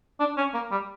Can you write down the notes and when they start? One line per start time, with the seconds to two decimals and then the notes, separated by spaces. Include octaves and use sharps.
0.20 D4
0.37 C#4
0.54 A#3
0.71 G3